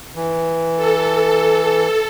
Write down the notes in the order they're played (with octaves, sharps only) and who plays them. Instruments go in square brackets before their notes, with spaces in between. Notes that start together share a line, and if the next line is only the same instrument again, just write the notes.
[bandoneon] E3
[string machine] A4